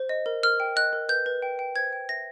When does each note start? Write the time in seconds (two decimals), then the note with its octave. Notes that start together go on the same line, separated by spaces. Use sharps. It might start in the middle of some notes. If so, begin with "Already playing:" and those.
Already playing: C5
0.09 D#5
0.26 A#4
0.43 A#4 F6
0.60 G5
0.76 D#5 F#6
0.93 A#4
1.09 B4 G6
1.26 B4
1.42 G5
1.59 G5
1.76 C5 G#6
1.93 G5
2.09 E5 A#6